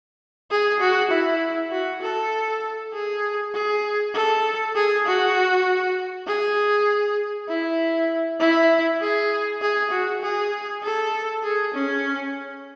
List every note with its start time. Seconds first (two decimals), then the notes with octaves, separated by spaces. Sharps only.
0.51 G#4
0.80 F#4
1.11 E4
1.72 F#4
2.02 A4
2.93 G#4
3.54 G#4
4.14 A4
4.75 G#4
5.06 F#4
6.27 G#4
7.49 E4
8.40 E4
9.01 G#4
9.62 G#4
9.91 F#4
10.22 G#4
10.83 A4
11.43 G#4
11.74 C#4